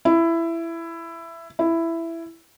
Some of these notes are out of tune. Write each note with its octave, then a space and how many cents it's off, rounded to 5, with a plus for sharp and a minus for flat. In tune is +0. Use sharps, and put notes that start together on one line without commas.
E4 +15
E4 +10